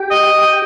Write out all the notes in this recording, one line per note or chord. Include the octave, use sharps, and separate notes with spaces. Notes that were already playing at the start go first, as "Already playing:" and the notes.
Already playing: G4 G5
D#5